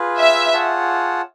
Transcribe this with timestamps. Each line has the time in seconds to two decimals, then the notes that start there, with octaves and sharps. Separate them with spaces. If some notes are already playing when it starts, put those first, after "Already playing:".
Already playing: F4 G#4 B4
0.19 E5
0.53 F4 G#4 C#5 F#5 A5